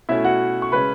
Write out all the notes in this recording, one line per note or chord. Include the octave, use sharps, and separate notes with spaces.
B2 A3 C#4 E4 E5
F#4 F#5
C#6
C#3 G#3 C#4 B4 B5